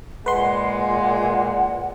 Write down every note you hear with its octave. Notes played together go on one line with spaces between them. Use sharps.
A#2 G#3 B4 F#5 C6